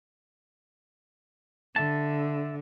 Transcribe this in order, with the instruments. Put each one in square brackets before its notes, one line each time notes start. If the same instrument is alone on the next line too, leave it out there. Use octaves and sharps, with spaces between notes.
[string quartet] D3 [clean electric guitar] E5 A5